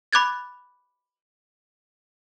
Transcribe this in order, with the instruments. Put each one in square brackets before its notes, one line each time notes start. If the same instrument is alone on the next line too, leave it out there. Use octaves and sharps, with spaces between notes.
[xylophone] B5 D6 F#6 G#6 A6